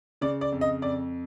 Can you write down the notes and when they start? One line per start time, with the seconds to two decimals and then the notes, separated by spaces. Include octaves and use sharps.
0.21 C#3 D5
0.41 D5
0.52 F2
0.61 D#5
0.82 F2 D5